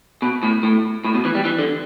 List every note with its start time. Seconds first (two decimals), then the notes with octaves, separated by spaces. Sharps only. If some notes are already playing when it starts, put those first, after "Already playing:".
0.22 B2
0.43 A2
0.63 A2
1.05 A2
1.15 B2
1.25 E3
1.35 G3
1.45 E3
1.59 D3